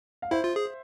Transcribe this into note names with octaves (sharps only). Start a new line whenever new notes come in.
F5
E4 C5 E5
F4
G#4